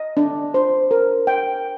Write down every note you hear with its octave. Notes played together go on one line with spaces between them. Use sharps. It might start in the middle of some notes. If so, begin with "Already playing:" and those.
Already playing: D#5
D4
C5
A#4
G5